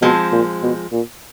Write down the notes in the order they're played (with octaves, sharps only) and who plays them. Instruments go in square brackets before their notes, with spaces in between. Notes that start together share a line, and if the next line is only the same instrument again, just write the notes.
[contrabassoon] B2 [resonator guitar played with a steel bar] F3 G#3 C4
[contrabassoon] A#2
B2
A#2